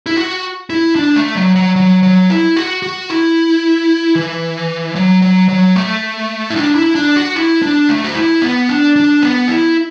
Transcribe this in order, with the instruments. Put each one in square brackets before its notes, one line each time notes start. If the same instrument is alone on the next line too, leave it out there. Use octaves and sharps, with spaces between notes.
[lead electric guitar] E4
F#4
E4
D4
A3
F#3
F#3
F#3
F#3
E4
F#4
F#4
E4
E3
F#3
F#3
F#3
A3
E4
D4
E4
D4
F#4
E4
D4
A3
F#4
E4
B3
D4
D4
B3
E4